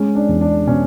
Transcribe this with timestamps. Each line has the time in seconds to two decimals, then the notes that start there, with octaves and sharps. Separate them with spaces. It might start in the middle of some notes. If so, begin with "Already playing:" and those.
Already playing: G#3 C#4
0.15 D4
0.29 E2
0.41 D4
0.67 B2 C#4